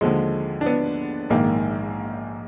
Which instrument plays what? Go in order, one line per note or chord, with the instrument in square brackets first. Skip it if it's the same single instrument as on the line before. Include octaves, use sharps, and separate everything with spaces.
[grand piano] D#2 D3 F3 G#3
D4
B3
A#1 G#2 D#3 A#3